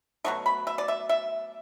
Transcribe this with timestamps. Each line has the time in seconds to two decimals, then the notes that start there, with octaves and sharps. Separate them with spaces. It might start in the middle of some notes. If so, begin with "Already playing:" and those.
0.24 B2 F#3 A3 C#6
0.46 B5
0.67 E5
0.78 D5
0.88 E5
1.09 E5